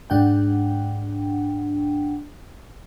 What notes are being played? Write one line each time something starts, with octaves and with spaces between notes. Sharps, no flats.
G#2 D4 F#5 G5